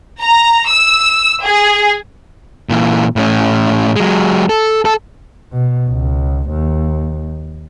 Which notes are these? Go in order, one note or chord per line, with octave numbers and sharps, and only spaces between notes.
A#5
E6
G#4
A#2 E3
A2 C#4
F#3 G#3
A4
A4
B2
C#2
D#2